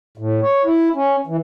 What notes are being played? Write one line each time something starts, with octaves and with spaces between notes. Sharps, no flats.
A2
C#5
E4
C#4
E3